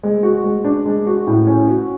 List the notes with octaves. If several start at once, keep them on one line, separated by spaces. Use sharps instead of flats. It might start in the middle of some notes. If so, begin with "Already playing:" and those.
G#3
F#4
G#3
D4
G#3
F#4
A2
C#4
F#4